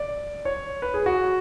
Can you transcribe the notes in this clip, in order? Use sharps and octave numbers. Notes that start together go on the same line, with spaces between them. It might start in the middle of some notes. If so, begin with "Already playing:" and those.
Already playing: D5
C#5
B4
G#4
F#4